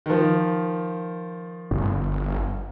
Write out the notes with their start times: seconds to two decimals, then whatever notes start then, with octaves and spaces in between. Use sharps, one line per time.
0.06 D#3 F3
1.71 G1